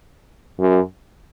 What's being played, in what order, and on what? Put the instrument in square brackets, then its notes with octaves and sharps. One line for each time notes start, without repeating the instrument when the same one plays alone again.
[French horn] F#2